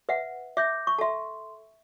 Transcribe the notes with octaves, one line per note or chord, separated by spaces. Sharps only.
B4 E5 F#5
E5 D6 G6 A#6
C#6
A4 E5 A5 C6